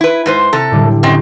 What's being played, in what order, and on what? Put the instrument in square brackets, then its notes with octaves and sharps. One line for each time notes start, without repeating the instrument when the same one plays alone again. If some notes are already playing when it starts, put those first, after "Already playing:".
[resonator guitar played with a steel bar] E4 B4
G#2 B4 C5
C3 A4
[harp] A2 D3 G3
[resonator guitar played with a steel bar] F#2 C4 D#5